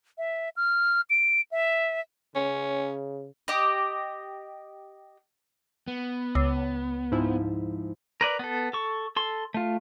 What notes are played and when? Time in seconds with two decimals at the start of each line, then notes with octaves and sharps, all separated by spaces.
0.18 E5
0.56 F6
1.10 D7
1.51 E5
2.35 C#3 C#4
3.48 G4 D#5
5.88 B3
6.35 C#2
7.12 G#2 F3 E4
8.21 A#4 B4 D5
8.39 B3 A4
8.73 A4 C#6
9.16 A4 C6
9.54 A3 F4